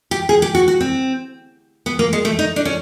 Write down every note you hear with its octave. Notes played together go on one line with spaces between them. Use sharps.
G4
G#4
G4
F#4
F#4
C4
B3
A#3
G#3
A3
D#4
D4
C#4